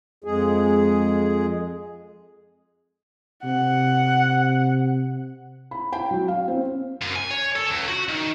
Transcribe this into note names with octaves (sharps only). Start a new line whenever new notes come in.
F2 G#3 G#4
C3 F#5
B5
G5
F#3
F5
C4
F#2
G#5
C#5
A4
C#2
F#4
D#3